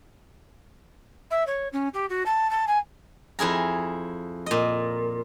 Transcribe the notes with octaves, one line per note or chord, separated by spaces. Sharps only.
E5
C#5
C#4
G4
F#4
A5
A5
G#5
F2 E4 G#4 A#5
A#2 D#5